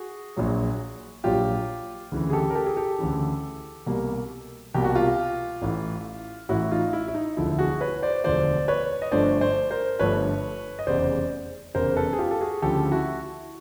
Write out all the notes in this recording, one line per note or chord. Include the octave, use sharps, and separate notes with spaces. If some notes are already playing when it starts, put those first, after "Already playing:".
Already playing: F#4 G#4
A#1 A#2 F#3
A#1 A#2 F#3 F4 G4
D2 C#3 E3
G#4
G4 A4
A#4
G4 A4
G#4
G4 A4
D2 C#3 E3
C2 B2 G3 A#3
C2 B2 G3 A#3 G4
F#4
F4 G4
A1 A2 E3
A1 A2 E3 E4 F#4
D#4 F4
E4
E4
D#4
E1 D2 D3 F3 E4
F#4 G#4
B4 C#5
C5 D5
E1 D2 D3 F3 C5 D5
B4 C#5
D#5
G1 G2 D3 F3 A3 C5 D5
C5 D5
A#4 C5
G1 G2 D3 F3 A3 B4 C#5
D#5
F1 E2 C#3 C5 D5
F1 E2 C#3 A#4 C5
A4 B4
G#4
F4 G4
A4
F#4 G#4
D2 C#3 F3 G4 A4
E4 F#4